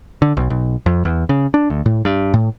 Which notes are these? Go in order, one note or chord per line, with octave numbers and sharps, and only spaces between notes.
D3
B1
B1
F2
E2
C#3
D4
D2
A2
G2
A2